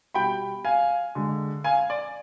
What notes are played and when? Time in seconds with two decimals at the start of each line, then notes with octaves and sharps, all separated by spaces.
0.14 B2 G3 G5 B5
0.65 F5 G#5
1.15 D3 G#3
1.64 F5 G#5
1.90 D5